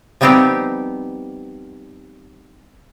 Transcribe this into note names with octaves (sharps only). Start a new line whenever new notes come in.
F3 G3 B3 C4 D#4 G4